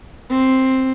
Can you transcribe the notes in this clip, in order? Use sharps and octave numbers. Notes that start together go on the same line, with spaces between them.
C4